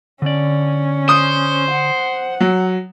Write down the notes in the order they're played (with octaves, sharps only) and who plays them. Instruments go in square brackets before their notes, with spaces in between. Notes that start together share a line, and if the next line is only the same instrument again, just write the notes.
[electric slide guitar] D3 D5 [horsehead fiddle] C#4
[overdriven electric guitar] C5 [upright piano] D#6
[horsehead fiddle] F#5
[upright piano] F#3